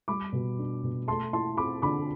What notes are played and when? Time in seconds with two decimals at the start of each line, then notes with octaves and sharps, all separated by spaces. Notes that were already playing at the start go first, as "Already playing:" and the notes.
0.08 G3 B5 D6
0.33 B2
0.59 D4
0.84 B2
1.08 A3 A5 C6
1.33 E4 A5 C6
1.57 C4 B5 D6
1.82 D3 B5 D6